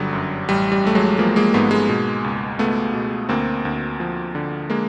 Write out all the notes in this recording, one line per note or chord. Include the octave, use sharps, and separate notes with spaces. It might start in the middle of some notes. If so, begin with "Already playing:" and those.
Already playing: G1 D3 F#3 G3
F#2
A1 G3
G3
A1 A3
F#3 G#3
F3 G#3 A#3
G#3 A#3
G#2 A3 B3
G#3 A#3
B2
C#2
C#2 A3 B3
B2
D2 A#3 C4
D2
F3
D3
G#3 A#3